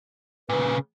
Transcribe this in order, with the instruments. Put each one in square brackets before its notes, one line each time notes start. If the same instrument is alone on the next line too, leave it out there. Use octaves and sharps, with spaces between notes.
[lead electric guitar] A#2 C#3 [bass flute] B4